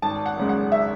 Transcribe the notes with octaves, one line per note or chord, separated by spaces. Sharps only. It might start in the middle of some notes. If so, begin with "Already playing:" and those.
G#1 A5
F#5
F#2 C#3 G#3
F#5
E5